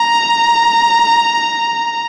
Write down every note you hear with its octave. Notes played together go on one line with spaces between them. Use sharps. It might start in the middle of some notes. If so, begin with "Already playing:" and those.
Already playing: A#5